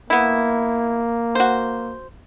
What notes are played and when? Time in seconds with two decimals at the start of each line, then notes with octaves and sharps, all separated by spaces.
0.10 A#3 B3 E4
1.35 F#4 C5